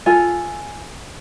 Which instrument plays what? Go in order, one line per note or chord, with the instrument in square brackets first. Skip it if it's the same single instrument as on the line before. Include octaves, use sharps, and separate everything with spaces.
[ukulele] F4 A4 G#5